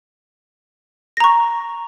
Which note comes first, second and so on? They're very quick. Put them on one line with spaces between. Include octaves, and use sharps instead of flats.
A#6 A#5 C#6